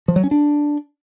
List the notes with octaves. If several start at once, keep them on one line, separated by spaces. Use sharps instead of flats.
F3
F#3
C#4
D4